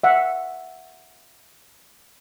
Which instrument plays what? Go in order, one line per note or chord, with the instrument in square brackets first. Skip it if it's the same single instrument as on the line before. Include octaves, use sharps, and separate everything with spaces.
[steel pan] E5 F#5